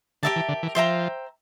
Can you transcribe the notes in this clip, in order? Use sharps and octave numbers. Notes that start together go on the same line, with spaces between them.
D3 G4 A#4 E5 A5
E3
D3
E3
F3 C5 E5 G5 A#5